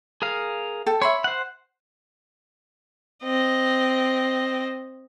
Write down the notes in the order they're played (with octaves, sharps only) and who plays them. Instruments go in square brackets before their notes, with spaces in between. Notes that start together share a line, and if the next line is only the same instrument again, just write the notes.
[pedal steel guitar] G#4 A#4 F5
[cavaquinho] A4 G5
[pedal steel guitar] C#5 [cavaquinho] E5 B5 C6
[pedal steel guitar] C5 F#5
[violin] C4 D#5